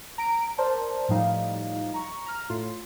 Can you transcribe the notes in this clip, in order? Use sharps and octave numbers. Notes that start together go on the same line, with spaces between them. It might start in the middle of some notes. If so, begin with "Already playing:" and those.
A#5 D7
A#4 C5 D5 A5
A2 F3 G3 D#4 F5
A#5 C#6
A#5 F6
A2 F4 C6